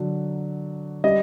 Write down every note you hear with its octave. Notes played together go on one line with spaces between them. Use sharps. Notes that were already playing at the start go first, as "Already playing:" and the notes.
Already playing: D3 F#3
G3 D#5